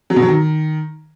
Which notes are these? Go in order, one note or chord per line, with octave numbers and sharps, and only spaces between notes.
F#3
B2
F#3
D#3